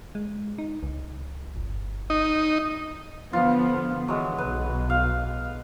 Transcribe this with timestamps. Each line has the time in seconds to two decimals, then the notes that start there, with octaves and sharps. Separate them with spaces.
0.15 G#3
0.58 D#4
0.83 C#2
1.56 G1
2.10 D#4
3.33 D3 F3 B3 F4
4.08 E3 F#3 G#3
4.38 B1 B4
4.90 F5